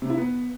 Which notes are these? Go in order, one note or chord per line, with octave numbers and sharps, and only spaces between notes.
C3
E4
B3